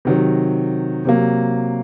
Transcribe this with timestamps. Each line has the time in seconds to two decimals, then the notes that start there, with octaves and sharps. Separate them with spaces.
0.05 C3 D#3 F#3
1.05 C3 F#3 A#3